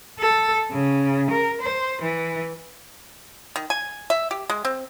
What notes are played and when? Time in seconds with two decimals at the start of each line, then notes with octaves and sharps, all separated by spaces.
0.19 A4
0.71 C#3
1.31 A#4
1.61 C5
2.02 E3
3.56 D#3
3.70 G#5
4.10 E5
4.31 G4
4.50 G#3
4.65 C4